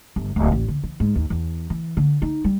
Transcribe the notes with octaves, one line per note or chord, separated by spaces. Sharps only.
G1
D1
A1
D3
E3
G#2
D#2
E2
E3
D3
D#4
G3